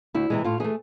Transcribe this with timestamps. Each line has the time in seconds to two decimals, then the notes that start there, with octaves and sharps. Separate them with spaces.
0.14 D2 E4
0.30 C3 E3 G#3
0.44 A2 F4
0.60 E3 A3 G#4